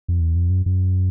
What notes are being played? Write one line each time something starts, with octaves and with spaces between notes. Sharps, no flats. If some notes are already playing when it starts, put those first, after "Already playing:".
F2
E2
F2
F#2
F#2